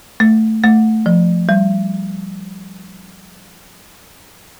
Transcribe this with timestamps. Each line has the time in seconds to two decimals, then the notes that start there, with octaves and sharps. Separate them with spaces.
0.20 A3
0.64 A3
1.06 F3
1.49 G3